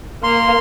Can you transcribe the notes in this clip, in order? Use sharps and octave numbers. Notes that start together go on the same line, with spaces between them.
A#3 C6